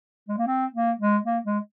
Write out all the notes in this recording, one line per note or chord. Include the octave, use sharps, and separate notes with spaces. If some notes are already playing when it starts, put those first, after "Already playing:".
G#3
A#3
C4
A#3
G#3
A#3
G#3